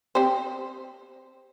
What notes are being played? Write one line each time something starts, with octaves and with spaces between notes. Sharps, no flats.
C4 G4 C5